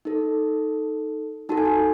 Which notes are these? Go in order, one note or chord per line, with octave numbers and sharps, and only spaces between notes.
D#4 A4
D#4 F#4 A4 A5
G#5
A5